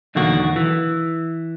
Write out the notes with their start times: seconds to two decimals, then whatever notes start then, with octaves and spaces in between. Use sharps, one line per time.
0.15 B1 E2 D3 D#3 A#3 F#4
0.56 E3